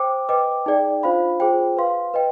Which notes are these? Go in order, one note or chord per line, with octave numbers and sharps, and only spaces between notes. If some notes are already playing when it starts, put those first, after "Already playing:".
Already playing: C5 G5 D6
B4 D#5 G5 D6
D#4 G#4 D5 G5
D4 F4 C5 F5 B5
F4 G#4 C5 G5
B4 F5 C6
B4 D#5 G5